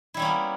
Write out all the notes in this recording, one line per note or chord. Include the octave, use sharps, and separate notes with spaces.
G3 A#3 B3 C#4 E4